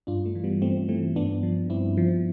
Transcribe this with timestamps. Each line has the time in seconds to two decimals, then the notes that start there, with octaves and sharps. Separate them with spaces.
0.07 G2 D4 F4
0.25 A3
0.35 E3
0.44 G3 B3
0.62 G2 A3 C4
0.89 E3 A3 C4
1.16 G2 B3 D4
1.43 F3
1.70 G2 C4 E4
1.97 F3